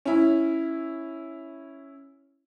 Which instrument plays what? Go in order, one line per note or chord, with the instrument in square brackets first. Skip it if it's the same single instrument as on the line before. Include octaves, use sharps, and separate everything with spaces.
[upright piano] C#4 E4